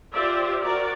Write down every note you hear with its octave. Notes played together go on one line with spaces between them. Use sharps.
F4 G4 C5 D5 E5
F#4 A#4 D5